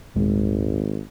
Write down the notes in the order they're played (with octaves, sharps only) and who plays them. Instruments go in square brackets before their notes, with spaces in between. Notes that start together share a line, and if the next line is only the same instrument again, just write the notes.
[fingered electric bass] D#1 G#3 [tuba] G#1